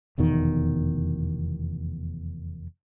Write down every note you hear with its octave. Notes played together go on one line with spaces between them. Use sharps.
F1 E2 B2 D#3